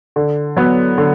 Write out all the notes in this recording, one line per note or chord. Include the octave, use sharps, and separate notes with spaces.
D3
F#3 B3
D3